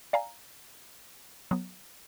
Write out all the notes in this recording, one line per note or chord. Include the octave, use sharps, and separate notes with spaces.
D5 F5 G#5 A#5
F#3 B3